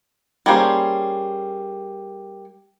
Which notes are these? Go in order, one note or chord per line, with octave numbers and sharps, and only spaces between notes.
G3 A#3 C#4 G#4 C5